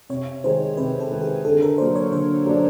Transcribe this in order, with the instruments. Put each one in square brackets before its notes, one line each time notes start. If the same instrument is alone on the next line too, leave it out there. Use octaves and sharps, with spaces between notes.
[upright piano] C3 [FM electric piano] C#5
[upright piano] D#3 G#3 [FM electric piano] C5
[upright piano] C3 [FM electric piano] B4
[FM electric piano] A4
[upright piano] D#3 G#3
[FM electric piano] G#4
[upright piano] D3 [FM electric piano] A4
[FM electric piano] A#4
[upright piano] F#3 A#3 D4 [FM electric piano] C5
[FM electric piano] C#5
[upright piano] D3 [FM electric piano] C5
[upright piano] F#3 A#3 D4